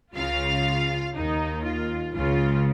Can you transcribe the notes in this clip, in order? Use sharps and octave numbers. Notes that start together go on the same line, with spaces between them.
C#2 C#3 F4 F5
D#2 D#3 D#4
F4
C#2 C#3 F4